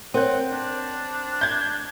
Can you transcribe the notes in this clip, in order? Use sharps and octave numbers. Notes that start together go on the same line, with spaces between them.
C4 A#4 C#5 F#5
D4
G6 G#6